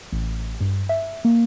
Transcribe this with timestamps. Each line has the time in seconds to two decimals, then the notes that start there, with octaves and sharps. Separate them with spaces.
0.12 A1
0.61 G2
0.89 E5
1.25 A#3